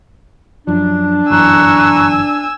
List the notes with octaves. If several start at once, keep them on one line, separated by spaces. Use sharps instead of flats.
F#2 F3 D4
G1 F#2 E3 G#5 A#5 C#6 E6 F#6